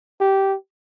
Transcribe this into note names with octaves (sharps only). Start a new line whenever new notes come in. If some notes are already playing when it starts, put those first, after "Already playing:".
G4